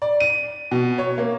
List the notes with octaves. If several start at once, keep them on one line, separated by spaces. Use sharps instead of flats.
D5
D#7
B2
C#5
A#3